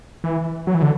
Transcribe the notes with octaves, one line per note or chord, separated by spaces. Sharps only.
E3
F#3
E3
D3